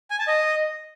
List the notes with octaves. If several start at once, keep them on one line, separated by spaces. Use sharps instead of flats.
G#5
A5
D#5